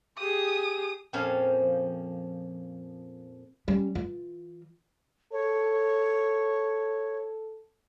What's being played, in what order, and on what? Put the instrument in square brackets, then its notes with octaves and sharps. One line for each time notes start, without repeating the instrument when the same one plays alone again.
[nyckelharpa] G4 G#4 [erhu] D#6
[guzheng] F2 A#2 F3 C#4 F5 G#5
[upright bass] G3 C#4
E3 F4
[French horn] A4 [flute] C#5